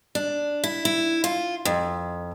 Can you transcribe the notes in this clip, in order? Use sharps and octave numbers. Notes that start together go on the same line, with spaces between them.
D4
E4
E4
F4
F2